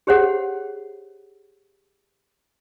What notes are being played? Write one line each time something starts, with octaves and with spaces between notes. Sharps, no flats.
G4 G#4 C5 C#5 F#5